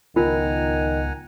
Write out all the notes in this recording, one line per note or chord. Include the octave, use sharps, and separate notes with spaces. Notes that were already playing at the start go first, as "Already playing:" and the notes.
C#2 D#3 B3 F4 A#4 F#5 G#5 A#5